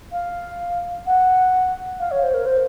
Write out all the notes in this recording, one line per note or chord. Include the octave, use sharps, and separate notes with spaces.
F5
F#5
F5
C#5
C5
A#4
C5